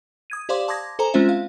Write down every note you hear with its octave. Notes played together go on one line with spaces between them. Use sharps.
D#6 G#6 D#7
G4 C5 D5 F5 C6 D6
A5 C6 D6 D#6 G#6 A#6
A4 C5 G#5 A#5
G#3 C4 C#4 F4 C5 E5
F5